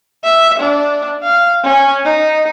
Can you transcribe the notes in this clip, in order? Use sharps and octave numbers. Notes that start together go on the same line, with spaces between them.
E5
D4
F5
C#4
D#4